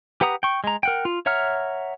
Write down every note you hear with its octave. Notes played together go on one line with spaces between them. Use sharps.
G4 B4 F#5 A#5 D#6
G5 C#6
G#3 A#5
A#4 F#5 G5
F4
C#5 E5 F#5 A#5 F6